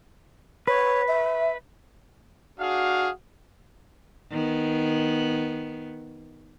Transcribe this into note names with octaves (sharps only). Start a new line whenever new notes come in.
B4 C#5
E5
D4 F#4 G#4 F5
D#3 B3